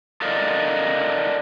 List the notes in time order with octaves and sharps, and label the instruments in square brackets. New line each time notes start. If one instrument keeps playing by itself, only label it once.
[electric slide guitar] A4 A#4 D5 D#5 F5